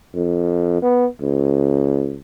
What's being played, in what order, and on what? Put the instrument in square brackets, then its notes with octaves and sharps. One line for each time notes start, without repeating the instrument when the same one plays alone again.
[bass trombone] F2
B3
C#2